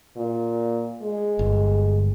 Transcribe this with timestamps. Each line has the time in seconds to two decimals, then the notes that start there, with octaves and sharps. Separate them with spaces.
0.17 A#2
1.02 G#3
1.39 G1